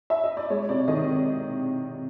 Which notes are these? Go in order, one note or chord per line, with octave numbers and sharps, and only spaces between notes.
E5
D#5
D5
G#3 C#5
C3 D5
D#3 D#5